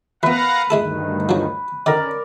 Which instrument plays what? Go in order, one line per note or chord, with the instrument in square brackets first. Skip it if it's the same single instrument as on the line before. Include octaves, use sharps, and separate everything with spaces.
[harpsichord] E3 B3 [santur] B4 [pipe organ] F5 F#5 A#5
[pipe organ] D2 G2 D#3 [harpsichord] G#3 E4 A4
[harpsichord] F3 F#3
[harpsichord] D3 D#3 [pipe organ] C#4 [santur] A#4 D5